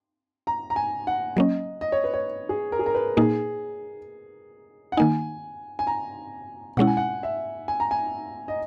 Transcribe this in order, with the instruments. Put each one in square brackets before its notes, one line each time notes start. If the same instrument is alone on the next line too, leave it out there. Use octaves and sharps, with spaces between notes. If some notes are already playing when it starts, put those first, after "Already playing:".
[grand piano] A#5
A#5
G#5
F#5
[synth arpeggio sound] F#3 A#3 C#4 [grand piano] D#5
[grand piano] D#5
C#5
B4
C#5
G#4
A#4
G#4
A#4
B4
[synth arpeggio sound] A#2 A#3 D#4 [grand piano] G#4
[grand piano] F#5
[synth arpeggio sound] D#3 A#3 D#4 [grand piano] G#5
[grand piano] G#5
A#5
[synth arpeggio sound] B2 G#3 C#4 E4 [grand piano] F#5
[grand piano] G#5
F#5
E5
G#5
A#5
G#5
D#5